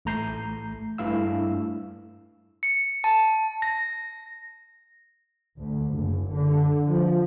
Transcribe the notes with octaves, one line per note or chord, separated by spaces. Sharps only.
A1 A3 A#5 G6 C7
G2 A3 E4 F5 E6
C#7
A5
A#6
D2
F#1
D3
F3